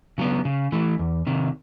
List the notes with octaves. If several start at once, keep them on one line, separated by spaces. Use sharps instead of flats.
C#3 F#3 B3
C#3
E3 A3
E2
C3 D#3